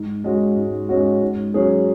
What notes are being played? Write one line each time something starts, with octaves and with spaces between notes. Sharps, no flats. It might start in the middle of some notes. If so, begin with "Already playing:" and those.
Already playing: G#2
G#3 C#4 F#4
G#2
G#3 C#4 F#4
G#2
F#3 C#4 G#4